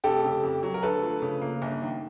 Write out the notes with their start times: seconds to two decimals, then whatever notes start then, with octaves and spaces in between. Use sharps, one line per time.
0.04 F1 G4 A4
0.24 C#3
0.43 F2
0.63 F#3
0.74 A#4
0.83 D2 A4 B4
1.03 F3
1.22 C#3
1.42 A#3
1.62 G1
1.82 D#3